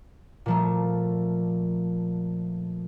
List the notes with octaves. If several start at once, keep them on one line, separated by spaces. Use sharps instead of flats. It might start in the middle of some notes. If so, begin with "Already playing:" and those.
A#2 F3 A3